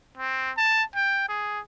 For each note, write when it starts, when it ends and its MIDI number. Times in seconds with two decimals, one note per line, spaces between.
0.17 0.51 60
0.57 0.83 81
0.96 1.28 79
1.29 1.60 68